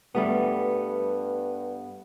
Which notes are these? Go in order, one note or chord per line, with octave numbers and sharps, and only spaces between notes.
G2 G3 A3 B3